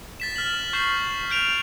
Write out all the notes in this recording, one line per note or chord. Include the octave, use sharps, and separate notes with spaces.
A6 B6 E7
F6 A6 F#7
C#6 G6 C7 E7 F#7
F6 G6 D7 F7